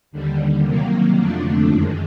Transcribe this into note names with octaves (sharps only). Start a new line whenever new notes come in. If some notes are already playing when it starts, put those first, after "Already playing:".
D#2 D3 G3
C3 D#3 F#3 A#3
F2 D3 F3 A3 D4
F#2 D#3 G#3